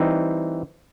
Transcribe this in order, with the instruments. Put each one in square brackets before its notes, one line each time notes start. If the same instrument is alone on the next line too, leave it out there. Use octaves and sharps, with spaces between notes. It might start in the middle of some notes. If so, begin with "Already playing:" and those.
Already playing: [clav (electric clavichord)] E3 G3 C4 D#4